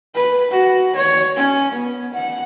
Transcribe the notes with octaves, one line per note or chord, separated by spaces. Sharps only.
B4
F#4
C#5
C#4
B3
F#5